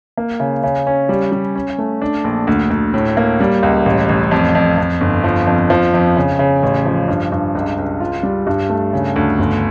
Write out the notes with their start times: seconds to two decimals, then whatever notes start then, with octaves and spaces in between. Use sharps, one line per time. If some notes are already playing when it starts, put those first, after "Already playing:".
0.18 A#3
0.40 C#3
0.63 C#3
0.87 C#4
1.09 G3
1.32 G3
1.55 C#4
1.78 A3
2.02 D4
2.24 A#1
2.47 D2
2.70 D2
2.94 A2
3.17 A#3
3.40 G3
3.63 C#2
3.86 A1
4.09 A1
4.31 F2
4.55 F2
4.78 F2
5.01 G1
5.24 F3
5.47 F2
5.70 F3
5.94 F2
6.17 C#3
6.39 C#3
6.63 A1
6.86 F3
7.08 G2
7.32 G2
7.55 C#2
7.78 C#2
8.00 F4
8.23 G3
8.47 G2
8.70 A3
8.93 C#3
9.16 D2
9.39 G1